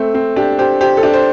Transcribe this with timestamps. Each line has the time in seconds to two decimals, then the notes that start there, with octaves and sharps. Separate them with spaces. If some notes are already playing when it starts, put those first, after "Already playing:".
Already playing: A3 C4
0.14 C4
0.36 D4 G4
0.58 G4 C5
0.81 G4 C5
0.97 A4
1.03 D4 G4
1.14 C5